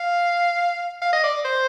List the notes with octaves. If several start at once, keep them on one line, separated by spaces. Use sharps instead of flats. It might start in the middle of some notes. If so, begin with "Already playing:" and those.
Already playing: F5
F5
D#5
D5
C5